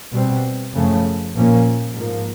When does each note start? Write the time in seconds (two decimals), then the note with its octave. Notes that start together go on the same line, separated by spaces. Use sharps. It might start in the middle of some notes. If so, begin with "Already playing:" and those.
0.13 B2 G3 C4
0.73 F#2 C#3 F3 A3
1.34 A#2 F3 A#3 C#4
1.94 G#2 F3 A#3